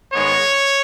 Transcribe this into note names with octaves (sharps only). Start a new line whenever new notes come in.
G#2 D#3 G#3 B3 C#5